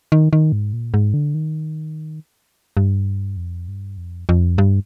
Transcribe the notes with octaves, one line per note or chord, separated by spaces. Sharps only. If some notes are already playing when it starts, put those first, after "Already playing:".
D#3
D#3
G#2
A#2
G#2
D3
D#3
G2
F2
G2
F2
F2
G2